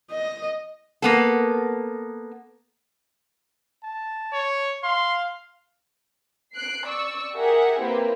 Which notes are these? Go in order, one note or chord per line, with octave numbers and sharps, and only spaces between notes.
D#5
A#3 B3 A4
A5
C#5
F5 C6
F#6 C7 D7
D5 C#6 E6
G4 G#4 A#4 E5 F#5
A#3 C4 E4 G4 B4